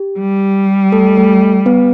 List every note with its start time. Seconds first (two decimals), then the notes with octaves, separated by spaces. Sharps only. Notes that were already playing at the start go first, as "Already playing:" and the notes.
Already playing: G4
0.19 G3
0.92 A3 A4
1.17 A3 A4
1.66 B3 B4